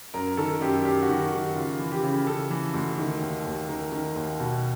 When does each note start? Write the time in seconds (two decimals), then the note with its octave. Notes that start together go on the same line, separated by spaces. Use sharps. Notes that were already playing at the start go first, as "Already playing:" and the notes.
0.14 F#2 A#4
0.37 D#3 A4
0.61 F#2 G4
0.85 F#2 G4
1.02 F#4
1.09 D#3
1.21 F#4
1.32 D#3
1.38 G4
1.56 C#3 F4
1.79 E3
1.92 G4
2.03 C#3
2.27 C#3 A4
2.51 E3
2.74 D2
2.98 D#3
3.21 D#2
3.44 D#2
3.69 D#3 A#4
3.92 D#3
4.16 D#2
4.40 B2